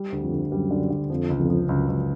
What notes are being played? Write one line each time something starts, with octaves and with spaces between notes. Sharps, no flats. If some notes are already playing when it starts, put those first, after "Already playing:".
Already playing: G3
D2
F2
D2
F#2 G3
D3
D3
F2 F3
C#2
F2
F3
C#2 F#2
C#2